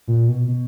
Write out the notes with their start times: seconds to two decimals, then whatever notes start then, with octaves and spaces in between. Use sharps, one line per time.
0.08 A#2
0.28 B2
0.48 B2